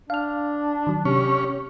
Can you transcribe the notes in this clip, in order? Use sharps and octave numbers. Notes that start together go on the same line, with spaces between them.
D4 F5 F6
D#3 F#3
C3 C#4 G4